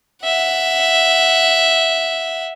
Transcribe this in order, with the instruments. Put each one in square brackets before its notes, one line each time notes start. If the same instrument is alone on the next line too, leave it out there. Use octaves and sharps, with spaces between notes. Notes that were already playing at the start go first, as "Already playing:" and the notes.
[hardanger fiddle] E5 F#5